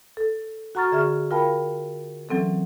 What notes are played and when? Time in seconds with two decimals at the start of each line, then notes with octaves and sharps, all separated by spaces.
0.17 A4
0.75 F#4 F#5 A#5 C#6 F6 A6
0.92 D3 G#4 E5 C#6 F6
1.31 F4 A#4 F5 G5 A5 B5
2.29 E3 F#3 C4 C#4 A4